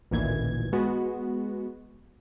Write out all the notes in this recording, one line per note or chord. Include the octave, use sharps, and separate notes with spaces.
A1 D2 A#2 D#3 E3 G#6
G#3 B3 F#4